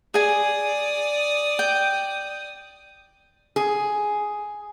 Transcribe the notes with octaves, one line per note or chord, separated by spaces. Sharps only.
G#4 D5 G#5 D#6
G5
G#4